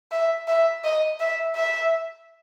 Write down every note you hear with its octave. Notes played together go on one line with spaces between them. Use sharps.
E5
E5
D#5
E5
E5